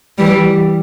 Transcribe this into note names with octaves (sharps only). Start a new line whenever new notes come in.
E3 G3